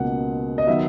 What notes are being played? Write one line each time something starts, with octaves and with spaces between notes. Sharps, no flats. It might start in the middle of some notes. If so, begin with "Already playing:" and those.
Already playing: C#2 B2 A#3 F#5
D#5
D#3 F#3 B3 E5